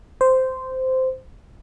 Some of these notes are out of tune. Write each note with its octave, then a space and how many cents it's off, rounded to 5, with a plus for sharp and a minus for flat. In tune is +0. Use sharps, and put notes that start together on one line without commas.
C5 -10